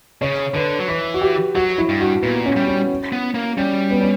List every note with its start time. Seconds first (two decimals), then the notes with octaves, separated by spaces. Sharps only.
0.21 C#3 C#5
0.54 D3 B4
0.80 F#3
0.88 E3 B4
1.14 F#4
1.21 G4
1.55 F#3 F#4
1.78 E4
1.89 G2
2.00 F#4
2.23 A#2 B3
2.46 C#4
2.56 G3
2.67 C#4
3.12 B3
3.35 A#3
3.57 G3 C#4
3.91 B3
4.01 C#4